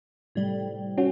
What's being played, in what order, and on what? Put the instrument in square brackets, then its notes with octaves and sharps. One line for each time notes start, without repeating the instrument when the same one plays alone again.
[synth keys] A2 C3 G3
[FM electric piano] C#4 F#4